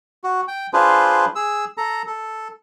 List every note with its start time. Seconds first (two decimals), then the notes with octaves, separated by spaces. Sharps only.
0.24 F#4
0.48 G5
0.73 D4 F4 G#4 B4 C5
1.36 G#4 E6
1.78 A4 A#5
2.07 A4